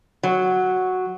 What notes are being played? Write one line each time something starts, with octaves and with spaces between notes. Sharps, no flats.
F#3